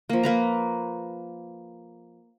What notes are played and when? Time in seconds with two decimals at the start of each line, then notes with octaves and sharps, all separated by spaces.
0.09 F3 A#3
0.23 A#3 B4 A#5